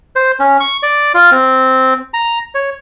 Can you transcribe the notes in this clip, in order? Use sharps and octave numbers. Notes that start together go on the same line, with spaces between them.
C5
C#4
C#6
D5
F4
C4
A#5
C#5